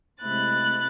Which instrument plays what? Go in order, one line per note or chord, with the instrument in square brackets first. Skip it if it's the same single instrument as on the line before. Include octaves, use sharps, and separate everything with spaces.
[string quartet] C3 G#3 A3 E4 F#6 A6